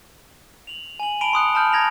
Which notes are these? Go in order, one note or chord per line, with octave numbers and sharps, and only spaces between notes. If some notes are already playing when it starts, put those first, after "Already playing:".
F7 F#7
G#5 F#7
A5 B5 D7 D#7 F7 G7
C6 D#6 F#6 C#7
A5 B5 F6 G6
A#5 G#6 A#6 F7